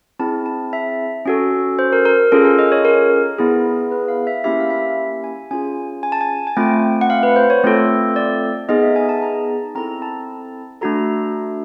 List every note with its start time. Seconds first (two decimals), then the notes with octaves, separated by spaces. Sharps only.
0.19 C4 E4 G#4 A5
0.46 A5
0.73 E5
1.25 C#4 F#4 A4
1.79 C5
1.93 A#4
2.06 A#4
2.32 C#4 F4 G#4 A4
2.45 A#4
2.59 D#5
2.72 C#5
2.85 A#4
3.38 B3 E4 G#4
3.91 B4
4.08 F5
4.27 E5
4.44 A#3 C#4 E4 G4 E5
4.60 F5
4.70 E5
5.24 G#5
5.51 C#4 F4 G#4 G#5
6.03 G#5
6.12 A5
6.21 G#5
6.47 G#5
6.57 A3 C4 F4 G5
7.01 F#5
7.10 F5
7.23 B4
7.36 C5
7.50 C#5
7.64 A3 C4 F4 A4
8.16 D5
8.69 B3 D#4 G#4 D#5
8.83 E5
8.96 G#5
9.09 A5
9.22 A#5
9.75 C4 E4 A4 A#5
10.02 A5
10.81 A3 D4 F#4 A4 A#5